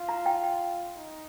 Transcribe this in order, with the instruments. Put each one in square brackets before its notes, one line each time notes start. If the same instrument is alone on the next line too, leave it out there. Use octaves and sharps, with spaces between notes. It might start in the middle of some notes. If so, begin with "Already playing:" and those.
Already playing: [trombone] F4
[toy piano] A#5
G5
G5
[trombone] D#4